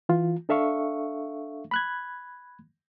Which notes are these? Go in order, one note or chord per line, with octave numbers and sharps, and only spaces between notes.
E3 F4
D4 A4 E5 F5 C#6
B5 F#6 G#6